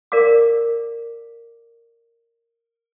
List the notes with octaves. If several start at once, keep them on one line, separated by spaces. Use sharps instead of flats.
A#4 D5 F5 D6